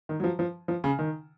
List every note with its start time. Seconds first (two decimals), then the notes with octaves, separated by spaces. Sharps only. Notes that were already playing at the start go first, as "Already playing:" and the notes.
0.09 D#3
0.20 F#3
0.24 F3
0.39 F3
0.68 F3
0.84 C#3
0.99 D#3